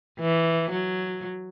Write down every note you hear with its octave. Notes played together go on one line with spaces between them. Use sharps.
E3
F#3